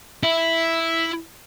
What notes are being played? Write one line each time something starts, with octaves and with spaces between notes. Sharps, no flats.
E4